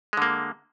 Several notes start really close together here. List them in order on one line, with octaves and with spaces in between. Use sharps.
G#3 D3 A#3